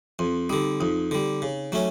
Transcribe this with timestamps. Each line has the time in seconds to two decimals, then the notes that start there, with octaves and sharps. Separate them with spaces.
0.19 F2 C4
0.50 D3 G3 D#4
0.80 F2 D#4
1.11 D3 G3
1.42 C#3
1.72 F#3 A3 C#4